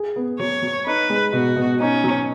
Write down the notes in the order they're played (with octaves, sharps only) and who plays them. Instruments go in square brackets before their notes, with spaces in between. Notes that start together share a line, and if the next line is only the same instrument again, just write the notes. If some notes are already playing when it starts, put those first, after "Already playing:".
Already playing: [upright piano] G#4
B3
[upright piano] F#3 [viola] C#5
[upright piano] F#3
[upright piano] D#4 [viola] B4
[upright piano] G#3
[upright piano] B2 [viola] F#4
[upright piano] B2
[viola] C#4 [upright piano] D#4
[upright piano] F#3